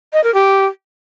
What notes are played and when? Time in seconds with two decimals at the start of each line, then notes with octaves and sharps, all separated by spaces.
0.13 D#5
0.24 A#4
0.34 G4